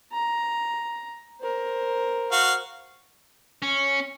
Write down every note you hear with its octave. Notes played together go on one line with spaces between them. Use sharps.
A#5
A#4 C5
F#4 F5
C#4